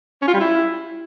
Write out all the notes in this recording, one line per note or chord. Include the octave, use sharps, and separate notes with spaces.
C#4
F4
G3
E4